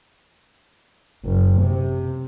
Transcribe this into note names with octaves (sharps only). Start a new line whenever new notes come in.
F#1
C3